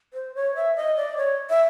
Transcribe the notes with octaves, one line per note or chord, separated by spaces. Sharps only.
C5
C#5
E5
D#5
D5
C#5
E5